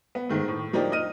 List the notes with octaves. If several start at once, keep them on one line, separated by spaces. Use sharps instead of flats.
B3
G#2 D#3 A3
A2
F3 A#3 D4 D#4 G4
D#4 D#5 F6 D#7